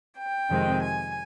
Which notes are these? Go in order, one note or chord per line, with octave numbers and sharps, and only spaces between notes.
G5
F2 C3 D#3 G#3 C4
G#5